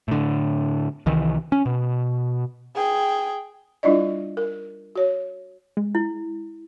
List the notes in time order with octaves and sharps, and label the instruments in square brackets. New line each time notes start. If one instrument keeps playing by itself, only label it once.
[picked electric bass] A2 D3
C2 D#3 E3
C#4
B2
[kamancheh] G#4 G5
[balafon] G3 D4 E4 F4 D5 D#5
A#4
F#4 C#5
[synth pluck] G#3
[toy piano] E4